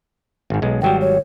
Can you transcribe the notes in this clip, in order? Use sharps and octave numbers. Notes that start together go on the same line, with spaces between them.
G#1 G#2
B1 G#3
G#1 F#3 G3 G5
C#5